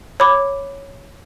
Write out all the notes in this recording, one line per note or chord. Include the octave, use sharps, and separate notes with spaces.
C#5 B5 D6